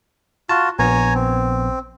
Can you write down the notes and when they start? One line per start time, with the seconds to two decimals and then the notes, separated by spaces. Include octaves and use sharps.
0.49 F4 F#4 A5
0.79 A#1 B3 C#5 G#5 A#5
1.14 C4